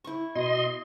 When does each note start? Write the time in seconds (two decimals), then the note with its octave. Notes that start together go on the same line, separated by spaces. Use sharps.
0.04 E4 C#6
0.35 B2 D#5 C6